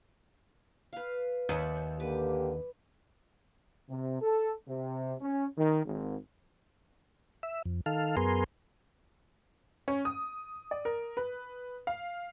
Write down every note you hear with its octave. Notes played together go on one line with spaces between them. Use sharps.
B4 F5
D#2 D5 E5 F#5
D3 A#3 G4 B4 D6
C3
A4
C3
C#4
D#3
G#1
E5
F2
D#3 A4 F5
F#2 B3 G#4 A#4 C6
C#4
D#6
D5
A#4
B4
F5